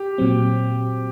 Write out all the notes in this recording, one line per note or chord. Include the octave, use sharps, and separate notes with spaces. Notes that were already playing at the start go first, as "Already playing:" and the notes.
Already playing: G4
A#2 F#3 C4